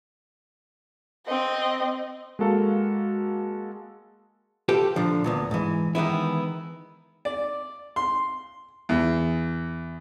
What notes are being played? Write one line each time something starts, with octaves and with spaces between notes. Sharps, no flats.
C4 D#5
G#3 A#3 F#4 A4 A#4 F5
F4 G4 A4 B4 G5
A#2 D3 F3
D2 A#2 B3
G#2 E3
D#3 E3 G#3 B3 E4
D5
C6
E2